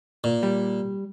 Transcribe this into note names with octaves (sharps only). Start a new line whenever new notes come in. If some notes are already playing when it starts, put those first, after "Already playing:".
A#2
G3